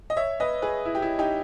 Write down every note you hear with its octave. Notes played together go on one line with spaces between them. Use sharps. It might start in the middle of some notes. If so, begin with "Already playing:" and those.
D#5
C#5 E5
B4 D#5
G#4 B4
E4
G4
E4
D#4 G4